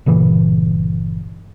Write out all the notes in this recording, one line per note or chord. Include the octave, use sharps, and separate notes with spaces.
G1 A#2 C#3 E3